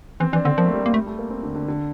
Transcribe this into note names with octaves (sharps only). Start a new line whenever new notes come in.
E3 C4
E3 D4
D3 C4
F3 A#3
A3
G3
A3 A#3
G3 A3
A3
A#3
C4
D3
D3
D3